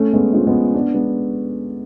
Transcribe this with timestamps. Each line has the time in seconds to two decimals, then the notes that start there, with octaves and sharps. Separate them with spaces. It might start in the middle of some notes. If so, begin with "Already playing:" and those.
Already playing: A3 C#4
0.13 G#3 B3
0.33 F3 G#3
0.47 G#3 B3
0.74 B3 D4
0.94 G#3 B3